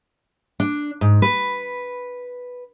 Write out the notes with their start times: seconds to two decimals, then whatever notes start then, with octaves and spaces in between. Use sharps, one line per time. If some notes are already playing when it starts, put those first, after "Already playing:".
0.60 D4
1.01 G#2
1.22 B4